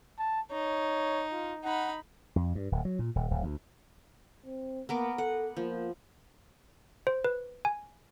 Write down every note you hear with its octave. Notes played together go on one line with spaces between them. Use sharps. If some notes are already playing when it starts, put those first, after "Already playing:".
A5
D#4 C#5
F4
D#4 F#5 B5
F2
G2
D1
F#3
A#2
D#1
D1
D2
C4
A#3 B3 A#4 D6
A4 F#5
F3 A#3
C5
B4
G#5